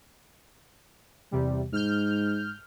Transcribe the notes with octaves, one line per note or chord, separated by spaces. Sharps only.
E2 C3 G3
G#2 F6 G6